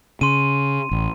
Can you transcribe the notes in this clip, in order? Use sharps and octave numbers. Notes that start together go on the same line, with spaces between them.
C#3 C6 D#7
A1